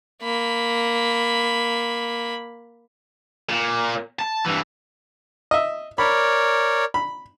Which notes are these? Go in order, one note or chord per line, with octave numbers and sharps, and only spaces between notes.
A#3 B5
A#2
A5
G2 E3
D#5 E5
A#4 C#5 D5 B5
B5